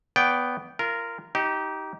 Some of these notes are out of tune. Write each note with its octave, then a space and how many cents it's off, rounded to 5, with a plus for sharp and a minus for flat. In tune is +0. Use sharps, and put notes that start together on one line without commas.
B3 +0 D5 -30 G5 -5
F4 -30 A#4 -5
D#4 +15 G4 -20